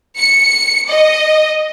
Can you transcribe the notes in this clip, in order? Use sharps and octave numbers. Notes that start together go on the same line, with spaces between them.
C#7
D#5